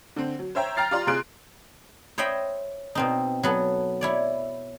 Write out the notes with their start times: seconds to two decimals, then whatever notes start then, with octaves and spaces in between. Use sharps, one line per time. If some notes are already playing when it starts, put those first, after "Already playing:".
0.16 D3 C4
0.39 F#3
0.55 C5 C#5 E5 G5 A#5
0.77 G5 A#5 F6 A6 C7
0.91 F4 G4 D5 A#5 C6
1.07 C3 F4 G#4 C6 F#6 D7
2.18 C5 C#5 D#5 E5 G5 B5
2.95 B2 C4 D#4
3.43 F#3 B3 A4
4.01 E4 C#5 D5